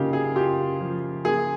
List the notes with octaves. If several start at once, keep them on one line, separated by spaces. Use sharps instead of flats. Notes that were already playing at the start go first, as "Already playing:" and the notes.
Already playing: C#3 A#3 D#4 F4 G4
G#4
F4 G4
F3
A#3 G#4